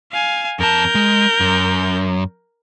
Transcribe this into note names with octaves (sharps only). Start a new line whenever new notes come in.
F5 G#5
F2 A#4 A5 G6
G#3
F#2